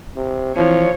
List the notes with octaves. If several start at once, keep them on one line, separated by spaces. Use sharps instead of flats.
C3
E3 F3 C4 C#5